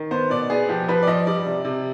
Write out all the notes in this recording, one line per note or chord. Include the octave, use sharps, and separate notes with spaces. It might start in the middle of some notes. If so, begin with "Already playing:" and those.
Already playing: D#3
B3 C5
B2 D5
B3 G#4
F3 G4
F3 B4
D5
F3 D#5
G3 D5
C3
C3